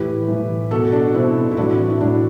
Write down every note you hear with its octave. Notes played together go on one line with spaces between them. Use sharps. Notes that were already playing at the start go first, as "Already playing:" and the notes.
Already playing: A2 E3 G4 B4
A2 E3
B2 F#4 A4
D4 F#4
B2 C4 E4
E4
A2 E3 D4 F#4
E4
A2 E3 D4 F#4